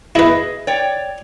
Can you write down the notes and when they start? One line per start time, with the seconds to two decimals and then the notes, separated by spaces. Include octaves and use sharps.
0.15 E4 G#4 B4 D#5 E5
0.67 C#5 D5 G5